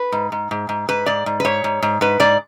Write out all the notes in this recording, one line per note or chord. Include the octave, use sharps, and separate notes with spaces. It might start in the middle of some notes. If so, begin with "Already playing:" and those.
Already playing: B4
G#2
G#2
G#2
G#2
G#2 B4
G#2 D5
G#2
B4
G#2 C#5
G#2
G#2
G#2 B4
G#2 D5